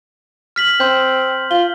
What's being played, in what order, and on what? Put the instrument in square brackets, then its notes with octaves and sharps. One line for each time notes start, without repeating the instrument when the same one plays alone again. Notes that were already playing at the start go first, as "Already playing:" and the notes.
[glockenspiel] F6 B6 F#7
[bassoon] C4 [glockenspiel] C6 G6
[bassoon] F4 [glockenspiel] G7